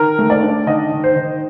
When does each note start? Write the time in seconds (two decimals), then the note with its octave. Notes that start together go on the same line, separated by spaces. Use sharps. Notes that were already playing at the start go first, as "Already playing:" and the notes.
Already playing: D#3 A#4
0.19 A3
0.30 D5
0.43 D4
0.67 D#3 D#5
0.92 D#3
1.04 C5
1.16 D#3